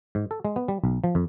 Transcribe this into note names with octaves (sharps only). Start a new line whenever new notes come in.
G#2
A4
G#3
B3
G3
B1
F3
F2